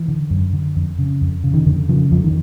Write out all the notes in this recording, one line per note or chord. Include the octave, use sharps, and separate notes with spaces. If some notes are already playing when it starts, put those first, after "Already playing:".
Already playing: E3
D3
F#2
D3
F2
C#3
F2
C#3
D#3
F2 D3
C#3 F3
F2 F3
D#3